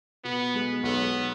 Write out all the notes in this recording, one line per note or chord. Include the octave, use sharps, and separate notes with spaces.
B2 B3
G#3
B1 B3